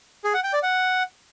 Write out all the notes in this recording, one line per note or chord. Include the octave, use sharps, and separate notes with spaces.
G#4
F#5
G5
D5
F#5